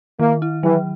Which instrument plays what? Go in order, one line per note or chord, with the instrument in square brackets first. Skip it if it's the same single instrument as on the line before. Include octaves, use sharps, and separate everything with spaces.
[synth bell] D#3 [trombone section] A#3
[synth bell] E4
[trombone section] E3 [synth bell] F#3